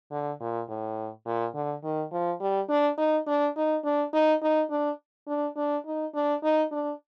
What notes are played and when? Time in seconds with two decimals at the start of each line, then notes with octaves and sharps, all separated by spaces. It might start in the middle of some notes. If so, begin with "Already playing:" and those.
0.11 D3
0.41 A#2
0.69 A2
1.26 A#2
1.54 D3
1.84 D#3
2.12 F3
2.40 G3
2.69 D4
2.98 D#4
3.27 D4
3.56 D#4
3.85 D4
4.13 D#4
4.42 D#4
4.70 D4
5.27 D4
5.57 D4
5.86 D#4
6.15 D4
6.43 D#4
6.72 D4